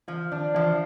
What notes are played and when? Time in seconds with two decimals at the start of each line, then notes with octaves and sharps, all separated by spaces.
0.08 E3 F3
0.32 D#3 D4
0.55 E3 F3